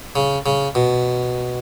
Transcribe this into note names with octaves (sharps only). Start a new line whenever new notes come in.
C#3
C#3
B2